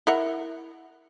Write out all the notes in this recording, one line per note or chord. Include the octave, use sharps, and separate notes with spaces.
E4 A#4 F#5